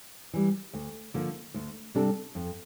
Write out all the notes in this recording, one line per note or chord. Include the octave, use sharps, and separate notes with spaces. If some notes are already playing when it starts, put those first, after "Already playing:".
E3 G3
D2
D3 F3 A#3
D2
C3 G3 D4 A4
F2